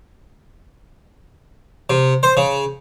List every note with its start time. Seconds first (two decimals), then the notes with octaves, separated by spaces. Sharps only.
1.90 C3
2.23 C5
2.37 C#3